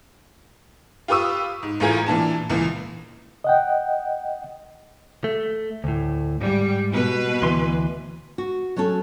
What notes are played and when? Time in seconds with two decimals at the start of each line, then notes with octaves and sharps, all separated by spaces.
1.08 F4 G4 B4 C#6 D#6 E6
1.63 G#2
1.80 A1 A2 F4 G#4 A#5 G#6
2.06 A#2 E3 D4 A5
2.50 C#2 A#2 E3
3.44 D#5 F#5 G5
5.24 A3
5.84 D2 A2
6.41 G#2 G3
6.91 B2 B4
7.42 D2 E3 C6
8.38 F#4
8.76 F#3 A3 C#4 A4